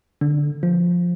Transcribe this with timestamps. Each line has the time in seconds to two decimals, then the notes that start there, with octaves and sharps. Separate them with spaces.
0.21 D3
0.63 F3